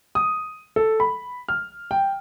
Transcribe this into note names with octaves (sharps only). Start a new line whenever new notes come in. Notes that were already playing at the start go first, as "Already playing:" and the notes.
D#6
A4
B5
F6
G5